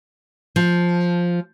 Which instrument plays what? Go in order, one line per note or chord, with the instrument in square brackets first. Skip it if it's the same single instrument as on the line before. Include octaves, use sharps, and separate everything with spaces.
[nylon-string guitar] F3